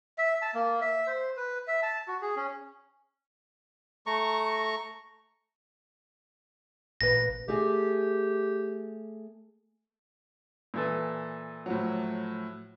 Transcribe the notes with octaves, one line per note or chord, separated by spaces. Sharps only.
E5
A5
A#3
E5
C5
B4
E5
A5
F#4
G#4
C#4
A3 A#5 C#6
A1 A#2 B4 A#6
A3 G4 G#4
A#2 E3 A4
A2 F3 F#3